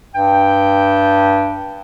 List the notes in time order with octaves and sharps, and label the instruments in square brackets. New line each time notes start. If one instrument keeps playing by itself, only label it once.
[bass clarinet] G2 [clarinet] G5